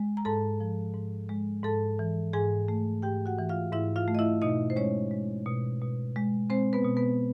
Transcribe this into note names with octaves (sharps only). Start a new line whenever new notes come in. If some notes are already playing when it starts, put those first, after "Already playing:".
Already playing: G#3
A#5
G#2 A4 A5
F3
G#2
G#3
G#2 A4 A5
E3
G#2 G#4 G#5
A3
G#2 G4 G5
F#4 F#5
E3
F4 F5
G#2 E4 E5
F4 F5
A3
D#5
E4 E5
B2 D#4 D#5
C5
G#3 C#4 C#5
G#3
B2
B2
G#3
G#3 C4 C5
B3 B4
B2
B3 B4